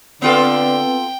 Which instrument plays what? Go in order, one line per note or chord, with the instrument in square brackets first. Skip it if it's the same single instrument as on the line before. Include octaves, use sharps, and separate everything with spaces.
[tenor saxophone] D3 [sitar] B3 F4 A4 [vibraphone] C4 B4 [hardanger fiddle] G5